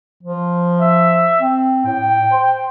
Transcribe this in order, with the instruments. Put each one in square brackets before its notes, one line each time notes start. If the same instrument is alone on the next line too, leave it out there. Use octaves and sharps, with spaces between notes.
[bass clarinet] F3
[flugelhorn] E5
[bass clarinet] C4
[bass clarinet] A2 [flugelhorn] G5
[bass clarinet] C5